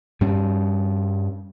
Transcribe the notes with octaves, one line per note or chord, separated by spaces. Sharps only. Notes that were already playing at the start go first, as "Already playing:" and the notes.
G2 G3 C#4